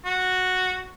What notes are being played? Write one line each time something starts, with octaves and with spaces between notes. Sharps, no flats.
F#4